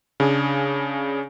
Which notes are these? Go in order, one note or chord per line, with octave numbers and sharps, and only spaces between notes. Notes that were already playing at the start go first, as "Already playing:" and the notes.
C#3 D4 G#4